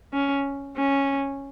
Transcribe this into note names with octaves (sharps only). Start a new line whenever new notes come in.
C#4
C#4